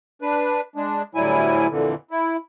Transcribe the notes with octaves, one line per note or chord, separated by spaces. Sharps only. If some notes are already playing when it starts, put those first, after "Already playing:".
D4 B4
G#3 D4
D2 A2 F#3 G3 E4 G#5
F2 A#2 D3 E3
E4